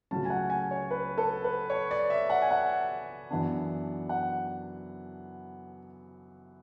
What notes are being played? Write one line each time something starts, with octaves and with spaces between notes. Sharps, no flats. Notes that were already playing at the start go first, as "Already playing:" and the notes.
C#2 C#3 F#3 A3 C#4 A5
G#5
F#5
G#5
C#5
B4
A4
B4
C#5
D5
E5
F#5
G#5
F#5
F#2 E3 B3 D4
F#5